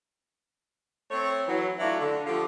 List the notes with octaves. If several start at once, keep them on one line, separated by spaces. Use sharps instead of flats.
A3 C4 C#5
E3 F#3
F#3 A3 D4 E4 F4
D3
D3 F3 A3 F4 G4